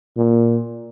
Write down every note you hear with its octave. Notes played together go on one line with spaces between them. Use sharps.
A#2